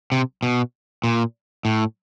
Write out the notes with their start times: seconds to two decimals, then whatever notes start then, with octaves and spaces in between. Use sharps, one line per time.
0.12 C3
0.43 B2
1.04 A#2
1.65 A2